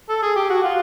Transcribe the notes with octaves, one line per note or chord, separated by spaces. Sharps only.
A4
G#4
G4
F#4
F4